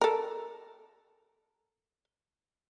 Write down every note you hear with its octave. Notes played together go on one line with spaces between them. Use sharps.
A4 A#4